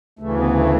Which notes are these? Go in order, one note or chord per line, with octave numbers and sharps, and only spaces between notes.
D2 C#3 E3 A3
B3
A3